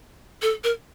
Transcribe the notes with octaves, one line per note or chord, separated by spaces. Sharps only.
A4
A#4